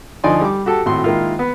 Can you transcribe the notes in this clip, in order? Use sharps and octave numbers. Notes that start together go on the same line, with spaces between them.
D2 F3 D#4 D5 G#5 C6
G3 D6
F#4 G4 A4 A5
G#1 A2 F#4 C6
D#3 G#3 A#3 E4 F4
B3